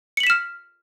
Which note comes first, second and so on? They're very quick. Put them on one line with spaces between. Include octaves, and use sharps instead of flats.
C#7 F#7 B6 E7 F6